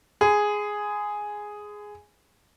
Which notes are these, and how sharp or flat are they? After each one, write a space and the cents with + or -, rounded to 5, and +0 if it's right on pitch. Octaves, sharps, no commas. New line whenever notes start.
G#4 +0 C6 -45